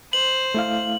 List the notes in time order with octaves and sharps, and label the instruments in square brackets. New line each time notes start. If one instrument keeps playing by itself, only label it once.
[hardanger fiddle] C5 [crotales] F#7
[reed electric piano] A3 E4 F5